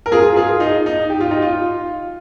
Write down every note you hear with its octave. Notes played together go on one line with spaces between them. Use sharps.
A#4
F4 G#4
F4 G#4
D#4
D#4
G4
F4
D#4
F4